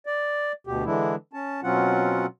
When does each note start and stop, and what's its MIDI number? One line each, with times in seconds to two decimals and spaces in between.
0.06 0.52 74
0.67 0.84 38
0.67 0.84 47
0.67 0.84 67
0.85 1.15 50
0.85 1.15 52
0.85 1.15 56
0.85 1.15 62
0.85 1.15 64
1.33 1.61 61
1.33 1.61 81
1.63 2.26 47
1.63 2.26 54
1.63 2.26 60
1.63 2.26 61
1.63 2.26 65
1.63 2.26 78